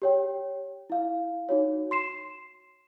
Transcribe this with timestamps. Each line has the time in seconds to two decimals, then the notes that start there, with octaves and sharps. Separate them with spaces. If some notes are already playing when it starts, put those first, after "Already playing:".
0.02 G4 C#5 G5
0.90 E4 F5
1.49 D#4 F#4 C#5
1.91 C6 C7 E7